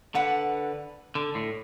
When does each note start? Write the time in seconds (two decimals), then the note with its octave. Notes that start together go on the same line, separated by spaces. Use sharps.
0.15 D3 B4 F#5 B5
1.15 D3
1.35 A2